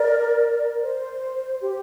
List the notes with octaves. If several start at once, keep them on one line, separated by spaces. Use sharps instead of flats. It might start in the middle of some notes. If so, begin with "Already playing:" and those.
Already playing: A#4 D5
C5
G4